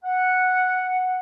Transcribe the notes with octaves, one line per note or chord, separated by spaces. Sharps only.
F#5